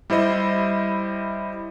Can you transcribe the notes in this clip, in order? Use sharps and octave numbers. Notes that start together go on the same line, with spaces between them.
G3 E4 C5 D#5